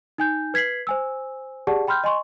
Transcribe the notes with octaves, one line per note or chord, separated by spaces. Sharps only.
D#4 G#5 G6
B4 G#6 B6 C7 F#7
C5 G#5 E6
G4 G#4 D5 F#5 A5
G5 B5 C6 F6 G6
D#5 G#5 C6 C#6